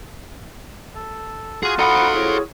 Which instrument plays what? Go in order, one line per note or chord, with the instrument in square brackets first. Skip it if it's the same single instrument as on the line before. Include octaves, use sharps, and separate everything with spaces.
[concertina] A4
[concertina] F4 F#4 [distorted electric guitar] G#4 G#5
[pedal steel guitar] D#4 F#5 D#6 [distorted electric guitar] A4 C5 [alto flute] B5
[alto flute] E4 [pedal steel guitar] G#4 C#5